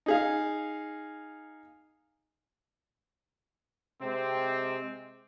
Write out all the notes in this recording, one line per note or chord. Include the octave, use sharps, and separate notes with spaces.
D#4 G#4 F5
C3 G#3 C4